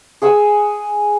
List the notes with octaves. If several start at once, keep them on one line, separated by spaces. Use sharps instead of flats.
G#4 F#5 G#5 E6